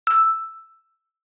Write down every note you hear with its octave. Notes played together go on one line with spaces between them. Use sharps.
E6